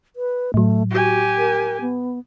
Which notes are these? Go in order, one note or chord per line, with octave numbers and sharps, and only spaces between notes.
B4
A2 F#3 A3
F#4 G4 G#5
A#4
B3